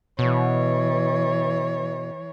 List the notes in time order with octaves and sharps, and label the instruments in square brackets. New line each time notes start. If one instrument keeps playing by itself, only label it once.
[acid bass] B2 [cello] E3 C#5